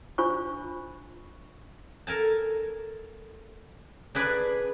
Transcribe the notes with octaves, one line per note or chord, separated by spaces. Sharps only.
D4 F4 C5 C#6
A4 A#4 G#5 A5
D4 G#4 B4 D5 G#5 B5